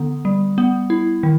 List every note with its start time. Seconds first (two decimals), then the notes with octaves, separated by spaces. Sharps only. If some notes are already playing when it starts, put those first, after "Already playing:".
Already playing: D3 B3
0.25 G3
0.58 B3
0.90 E4
1.23 D#3